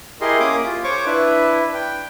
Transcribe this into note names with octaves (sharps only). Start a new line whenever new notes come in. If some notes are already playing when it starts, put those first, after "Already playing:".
E4 G4 G#4 A#4 D#5 C6
A#3 C#4 G#4 D6 D#6
F4
C5 C#5 C#6 D6
D4 E4 B4
G5